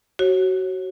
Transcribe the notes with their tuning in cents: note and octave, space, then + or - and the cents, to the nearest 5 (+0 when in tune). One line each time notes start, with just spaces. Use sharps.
F#4 +25 C#5 -30